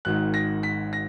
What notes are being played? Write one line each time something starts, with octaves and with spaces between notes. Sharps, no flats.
G#1 G#2 D#3 F#6
A#6
B6
A#6